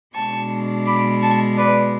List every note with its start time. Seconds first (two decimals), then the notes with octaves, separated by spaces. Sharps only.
0.15 B2 G#3 D4 A5 C#6
0.86 B5 D6
1.22 A5 C#6
1.57 B4 D5